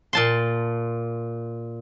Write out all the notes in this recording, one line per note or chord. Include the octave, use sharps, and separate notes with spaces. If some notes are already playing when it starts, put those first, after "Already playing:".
A#2 A5 C6